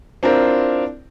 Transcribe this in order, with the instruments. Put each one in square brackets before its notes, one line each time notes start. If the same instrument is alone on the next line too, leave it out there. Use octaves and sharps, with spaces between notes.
[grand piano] C4 D4 E4 F4 A#4 C5